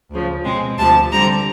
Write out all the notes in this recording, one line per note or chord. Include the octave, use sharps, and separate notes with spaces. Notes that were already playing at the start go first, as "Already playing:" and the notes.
D2 C#3 F3
B2 G#3 C4
D2 C3 F3 A5
D3 G3 C4 A#5